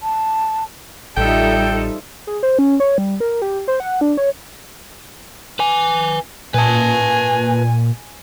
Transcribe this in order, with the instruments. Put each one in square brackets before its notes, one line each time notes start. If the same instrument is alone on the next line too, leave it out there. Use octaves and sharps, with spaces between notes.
[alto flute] A5
[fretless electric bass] A1 [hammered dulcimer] F3 E5 [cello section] G3 D#4 A4 [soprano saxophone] G5
[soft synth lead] G#4
C5
C#4
C#5
G3
A#4
G4
C5
F#5
D4
C#5
[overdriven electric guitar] B4 G#5
[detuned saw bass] A#2 [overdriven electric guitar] B4 A5 [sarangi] G#5